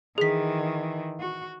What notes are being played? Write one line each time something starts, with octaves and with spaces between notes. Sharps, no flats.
D#3 E3 G#4 B6
F#4